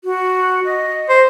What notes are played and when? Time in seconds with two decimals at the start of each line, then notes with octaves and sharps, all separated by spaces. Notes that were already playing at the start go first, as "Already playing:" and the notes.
0.04 F#4
0.65 D#5
1.09 C5